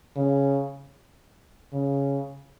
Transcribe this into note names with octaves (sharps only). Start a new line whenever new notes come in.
C#3
C#3